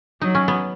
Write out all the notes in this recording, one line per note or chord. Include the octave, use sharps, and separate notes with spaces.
F#3 D#4
C#4
B3